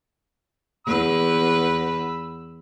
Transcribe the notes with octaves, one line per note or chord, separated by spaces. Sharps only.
E2 B4 B5 E6